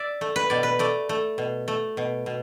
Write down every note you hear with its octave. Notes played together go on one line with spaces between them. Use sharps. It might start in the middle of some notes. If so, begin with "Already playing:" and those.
Already playing: D5 E5
A3
B4
B2 D5
B4
A3 D5
A3
B2
A3
B2
B2